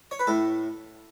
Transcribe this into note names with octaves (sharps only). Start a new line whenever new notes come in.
C#5
B4
A2 A4